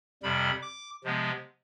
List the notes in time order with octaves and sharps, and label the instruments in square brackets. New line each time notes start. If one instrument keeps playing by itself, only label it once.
[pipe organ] F2 C3 G3 B5
D6
C3 F3 G#3 B3